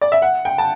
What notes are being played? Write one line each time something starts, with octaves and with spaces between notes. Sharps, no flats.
D5
E5
F#5
G5
A5